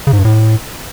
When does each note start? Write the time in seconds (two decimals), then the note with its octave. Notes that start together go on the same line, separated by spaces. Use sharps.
0.07 C#3
0.13 G#2
0.19 G2
0.25 A2